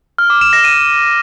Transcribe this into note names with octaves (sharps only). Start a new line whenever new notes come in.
F6
D6
E7
A#6
D#7